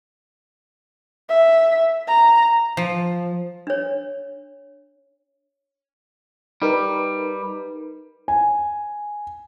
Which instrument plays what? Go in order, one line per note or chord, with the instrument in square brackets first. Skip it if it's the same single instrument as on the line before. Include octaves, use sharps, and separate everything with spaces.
[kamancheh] E5
A#5
[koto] F3
[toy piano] D4 C#5
[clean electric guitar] G3 [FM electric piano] D#4 A#4 B4
[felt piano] G#5